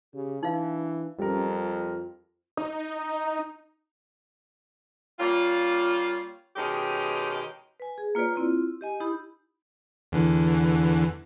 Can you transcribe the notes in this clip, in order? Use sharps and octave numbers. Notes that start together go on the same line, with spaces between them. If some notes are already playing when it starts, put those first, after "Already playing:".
C#3 G4
E3 D4 D#4 F5
F2 G3 C#4 A#4
F4
D#4
G3 A#3 C#4 F4
B2 D#3 G#3 C#4 D#4 G4
B4 G#5
G#4
A#3 F4 B4 C#5 D5
C4 E4 F4
G4 D#5 G#5
D#4 E4 G4 B5
E2 D3 E3